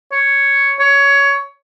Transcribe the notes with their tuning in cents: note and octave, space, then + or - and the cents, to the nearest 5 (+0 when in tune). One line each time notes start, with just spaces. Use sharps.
C#5 +0
C#5 +15